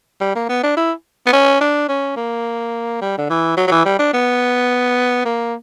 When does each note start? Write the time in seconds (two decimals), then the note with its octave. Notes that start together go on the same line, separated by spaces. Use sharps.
0.21 G3
0.35 A#3
0.49 B3
0.63 D4
0.77 E4
1.27 B3
1.33 C#4
1.61 D4
1.89 C#4
2.16 A#3
3.01 G3
3.18 D3
3.30 E3
3.57 F#3
3.67 F#3
3.71 E3
3.85 G3
3.99 D4
4.13 B3
5.25 A#3